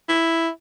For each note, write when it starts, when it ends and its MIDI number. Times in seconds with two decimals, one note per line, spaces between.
0.09 0.49 64